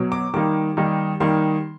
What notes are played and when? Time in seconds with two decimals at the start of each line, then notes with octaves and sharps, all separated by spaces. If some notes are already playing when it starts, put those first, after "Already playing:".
Already playing: B2 F#3
0.12 D6
0.34 D#3 G3 A#3 D#4 D6
0.77 D#3 G3 A#3 D#4
1.20 D#3 G3 A#3 D#4 C6